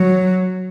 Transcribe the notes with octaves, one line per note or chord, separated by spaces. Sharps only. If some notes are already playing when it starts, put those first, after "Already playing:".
Already playing: F#3